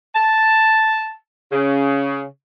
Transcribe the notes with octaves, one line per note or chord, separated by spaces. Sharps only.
A5
C#3